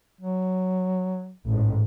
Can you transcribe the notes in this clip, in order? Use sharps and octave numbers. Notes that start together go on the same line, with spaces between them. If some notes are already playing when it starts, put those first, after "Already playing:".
F#3
A1 G#2